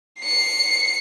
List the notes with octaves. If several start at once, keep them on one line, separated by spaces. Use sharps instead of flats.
C7 C#7